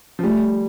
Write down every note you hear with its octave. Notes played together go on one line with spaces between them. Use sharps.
F3
G3 A3